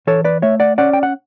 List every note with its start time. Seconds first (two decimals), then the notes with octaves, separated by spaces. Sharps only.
0.07 E3 A4 C#5
0.24 B4 D5
0.42 A3 C#5 E5
0.60 D5 F#5
0.78 C#4 D5 F#5
0.93 G5
1.03 F#5